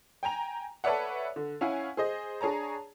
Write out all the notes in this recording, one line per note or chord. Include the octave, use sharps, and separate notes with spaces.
G5 G#5 A#5 F7
A4 B4 C#5 D5 E5 F#5
D3
C#4 E4 F5 F#5 G#5
G#4 C5 D#5
D4 G#4 C#5 A5 A#5